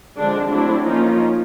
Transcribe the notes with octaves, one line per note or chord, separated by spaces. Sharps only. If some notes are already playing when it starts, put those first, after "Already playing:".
D3 F3 G#3 C4 D4
F#3 A3 C4 D4 E4
F3 A#3 C#4 D#4 F4